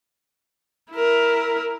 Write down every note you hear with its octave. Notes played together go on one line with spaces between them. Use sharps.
E4 A#4